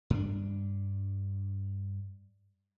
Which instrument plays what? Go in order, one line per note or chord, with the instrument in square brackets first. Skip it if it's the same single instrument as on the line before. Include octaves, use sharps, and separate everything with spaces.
[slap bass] G2 D4